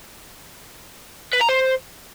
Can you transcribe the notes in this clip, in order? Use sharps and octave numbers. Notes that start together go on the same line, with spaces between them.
B4
A#5
C5